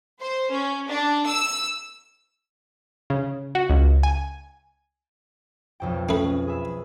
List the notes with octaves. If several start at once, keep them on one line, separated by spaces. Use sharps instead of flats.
C5
C#4
D4
E6
C#3
F#4
C#2
G#5
B1 F2 G5
A3 C#4 B4 D#6
G#4 E5 B5